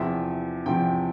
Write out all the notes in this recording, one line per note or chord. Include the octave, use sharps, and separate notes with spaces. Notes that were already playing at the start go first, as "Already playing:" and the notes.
Already playing: E2 C3 F3 E5
E2 C3 F3 G5